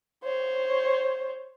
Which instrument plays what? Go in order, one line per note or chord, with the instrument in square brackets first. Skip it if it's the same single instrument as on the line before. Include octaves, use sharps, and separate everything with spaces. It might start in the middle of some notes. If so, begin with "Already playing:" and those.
[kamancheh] C5 C#5